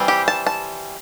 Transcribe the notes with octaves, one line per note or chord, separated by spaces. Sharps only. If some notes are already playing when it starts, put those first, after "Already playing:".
Already playing: E3 G3 C4
G4
A5
A5